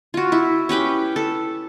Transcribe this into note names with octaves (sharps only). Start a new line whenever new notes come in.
F4 F#4
E4
C#4 G4 B4 G5
A4